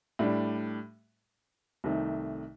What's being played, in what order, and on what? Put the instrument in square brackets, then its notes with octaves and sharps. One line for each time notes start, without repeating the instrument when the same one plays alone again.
[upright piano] A2 G3 D4
C2 C3 D#3 A3 D#4